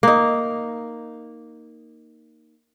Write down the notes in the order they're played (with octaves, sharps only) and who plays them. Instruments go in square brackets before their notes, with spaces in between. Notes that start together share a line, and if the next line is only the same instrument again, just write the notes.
[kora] A#3 D#4